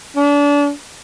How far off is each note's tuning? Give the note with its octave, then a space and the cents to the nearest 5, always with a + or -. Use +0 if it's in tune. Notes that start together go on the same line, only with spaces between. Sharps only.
D4 -30